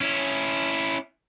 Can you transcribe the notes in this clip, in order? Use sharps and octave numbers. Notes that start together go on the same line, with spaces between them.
C#4 E4